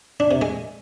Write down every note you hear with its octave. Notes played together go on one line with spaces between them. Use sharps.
D4
C3
G#3